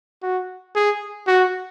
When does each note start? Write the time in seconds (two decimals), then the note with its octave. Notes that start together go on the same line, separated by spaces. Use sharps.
0.23 F#4
0.75 G#4
1.27 F#4